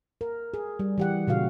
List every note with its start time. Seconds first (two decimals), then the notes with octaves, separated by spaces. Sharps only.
0.21 A#4
0.54 G#4
0.79 G3
0.98 E3 G4 F#5
1.27 A#2 C#3 F#4 F5